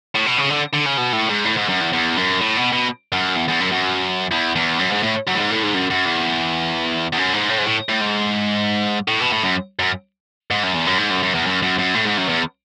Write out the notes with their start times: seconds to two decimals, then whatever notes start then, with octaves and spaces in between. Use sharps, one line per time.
0.15 A2
0.27 B2
0.38 C#3
0.50 D3
0.74 D3
0.86 C#3
0.98 B2
1.13 A2
1.29 G#2
1.45 A2
1.57 G#2
1.69 F#2
1.81 E2
1.93 E2
2.17 F#2
2.41 A2
2.57 B2
2.72 B2
3.13 F#2
3.36 E2
3.48 E2
3.60 F#2
3.72 F#2
4.32 E2
4.55 E2
4.79 F#2
4.91 G#2
5.03 A2
5.27 F#2
5.34 A2
5.39 G#2
5.51 A2
5.63 G#2
5.75 F#2
5.90 F#2
6.06 E2
7.13 E2
7.18 F#2
7.33 G#2
7.49 A2
7.59 G#2
7.65 A2
7.89 A2
8.01 G#2
9.08 A2
9.20 B2
9.32 A2
9.43 F#2
9.80 F#2
10.51 G#2
10.63 F#2
10.74 E2
10.87 F#2
10.99 G#2
11.11 F#2
11.23 F#2
11.34 E2
11.46 F#2
11.62 F#2
11.79 F#2
11.95 A2
12.06 G#2
12.18 F#2
12.29 E2